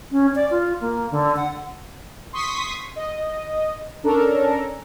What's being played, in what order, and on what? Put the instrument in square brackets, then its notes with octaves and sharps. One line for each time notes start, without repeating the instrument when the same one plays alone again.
[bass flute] C#4
D5
F4
A#3
D3
F#5
[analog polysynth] C6 C#6 D#6 B6
D#5
C#4 D4 A4 A#4